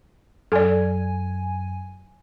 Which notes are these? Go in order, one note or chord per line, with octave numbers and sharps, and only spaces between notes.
F#2 A4 D5 G#5